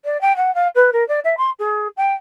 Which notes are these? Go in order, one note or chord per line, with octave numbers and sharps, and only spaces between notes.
D5
G5
F#5
F5
B4
A#4
D5
E5
C6
G#4
G5